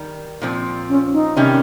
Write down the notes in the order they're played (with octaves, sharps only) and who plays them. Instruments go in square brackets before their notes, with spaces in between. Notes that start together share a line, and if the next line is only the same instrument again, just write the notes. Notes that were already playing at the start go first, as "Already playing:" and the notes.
Already playing: [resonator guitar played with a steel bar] D#3 G3
A#2 F3 C4
[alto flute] C#4
D#4
[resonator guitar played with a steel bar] C3 D#3 G3 C#4